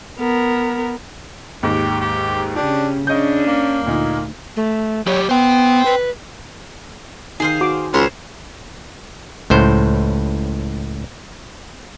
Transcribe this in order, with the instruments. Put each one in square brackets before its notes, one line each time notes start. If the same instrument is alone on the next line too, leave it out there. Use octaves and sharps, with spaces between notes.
[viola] B3 A#4
[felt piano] D#2 G#2 [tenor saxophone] G4
[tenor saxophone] G4
[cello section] C#3 C#4 [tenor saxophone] D4 [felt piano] G4
[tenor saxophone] C#3 [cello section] C#4 D4 [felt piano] D#5 G6
[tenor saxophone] A#3
[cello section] D2 [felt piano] A#2 D#4
[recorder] A3
[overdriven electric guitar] F#3 G4 [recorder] C#5
[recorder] B3 [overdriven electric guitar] C5 G5
[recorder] B4
[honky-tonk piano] D#3 [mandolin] G#4 C5 F5
[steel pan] F#4 D6
[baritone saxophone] C#2 [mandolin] C5 C#5
[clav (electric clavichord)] C#2 A2 C5